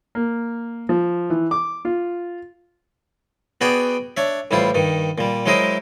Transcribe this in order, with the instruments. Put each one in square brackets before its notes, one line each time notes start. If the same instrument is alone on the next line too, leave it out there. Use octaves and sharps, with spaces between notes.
[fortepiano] A#3
F3
E3
D6
F4
[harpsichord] B3 F#4 G#4 D5 G5
D4 C#5 E5
A1 G3 E4 F4 C5
G2 D#3
A#2 G3
F#3 G#3 E4 A#4 C5 D#5